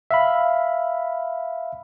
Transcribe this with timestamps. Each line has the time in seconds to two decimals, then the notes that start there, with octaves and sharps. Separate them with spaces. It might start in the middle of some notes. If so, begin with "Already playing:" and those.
0.11 E5 F5 B5